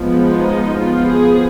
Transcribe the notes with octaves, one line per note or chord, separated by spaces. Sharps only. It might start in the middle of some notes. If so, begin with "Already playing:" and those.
Already playing: F3 G#3 B3
D#4
F3 B3 F4
G#4